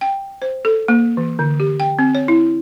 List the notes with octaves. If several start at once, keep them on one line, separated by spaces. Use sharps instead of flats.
G5
C5
A4
A#3
E3
D3
G4
G5
C4
C#5
E4